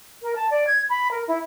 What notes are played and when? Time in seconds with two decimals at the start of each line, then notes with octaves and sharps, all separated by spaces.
0.23 A#4
0.36 A5
0.51 D5
0.67 G#6
0.90 B5
1.11 A#4
1.28 E4